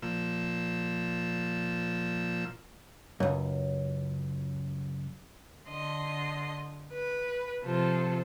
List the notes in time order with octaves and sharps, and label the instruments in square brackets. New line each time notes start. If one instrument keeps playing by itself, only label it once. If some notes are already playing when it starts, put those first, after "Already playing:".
[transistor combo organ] A#2 F3 E6
[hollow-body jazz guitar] C#2 F#2
[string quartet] D3 D#5 C6
B4
C3 F3 F4 A4 C5